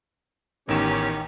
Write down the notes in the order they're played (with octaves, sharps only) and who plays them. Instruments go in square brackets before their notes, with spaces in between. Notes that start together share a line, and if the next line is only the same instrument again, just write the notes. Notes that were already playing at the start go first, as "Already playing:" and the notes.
[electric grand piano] A1 E2 E7 [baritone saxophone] D#3 [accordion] C#4 G4 C#5